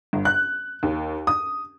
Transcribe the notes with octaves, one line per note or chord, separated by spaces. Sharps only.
G1
F#6
D#2
D#6